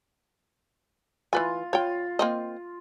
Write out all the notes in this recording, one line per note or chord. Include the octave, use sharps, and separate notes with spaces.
E3 F4 B4 G#5
F4 C#5 G5
A#3 C4 D#5